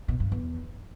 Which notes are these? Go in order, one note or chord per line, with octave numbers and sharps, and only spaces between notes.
B2
G2
E2